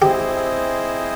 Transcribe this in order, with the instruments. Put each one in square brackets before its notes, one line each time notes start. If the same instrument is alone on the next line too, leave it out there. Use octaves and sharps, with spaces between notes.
[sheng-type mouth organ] C4 E4 G#4 C5 D#5 [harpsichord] G4